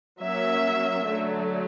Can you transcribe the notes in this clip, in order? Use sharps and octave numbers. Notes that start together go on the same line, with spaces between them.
F#3 A#3 C#4 E5
D3 F#3 A3